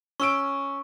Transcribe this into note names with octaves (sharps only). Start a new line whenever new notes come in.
C#4 C#6 E6 D7